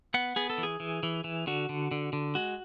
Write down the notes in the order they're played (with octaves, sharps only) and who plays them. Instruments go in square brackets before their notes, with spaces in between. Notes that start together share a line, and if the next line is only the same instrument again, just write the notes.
[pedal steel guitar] B3 F#5
B3 G#4
A4
E3
G#4
E3
E3
E3
D3 F#4
D3
D3
D3
G#3 F#4